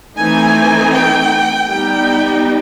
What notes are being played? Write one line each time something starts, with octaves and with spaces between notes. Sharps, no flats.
E3 A3 C4 D#4 G#5
G5
G3 B3 D#4 G5